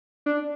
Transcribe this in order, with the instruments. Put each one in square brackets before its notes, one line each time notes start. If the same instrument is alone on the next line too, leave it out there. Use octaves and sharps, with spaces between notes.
[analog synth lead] D4